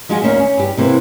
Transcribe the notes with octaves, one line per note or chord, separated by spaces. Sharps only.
F3 G#3 F4 F#4 G#4
D2 A#3 C#4 D#4 E5
C#4
G2 G4
C3 E3 A#3 C4